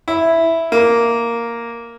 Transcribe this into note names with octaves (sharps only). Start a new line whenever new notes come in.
E4
A#3